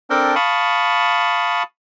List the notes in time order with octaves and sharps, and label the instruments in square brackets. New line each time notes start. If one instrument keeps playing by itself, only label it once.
[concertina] C4 D4 A4 A#4 G5
F5 A5 B5 C#6 D#6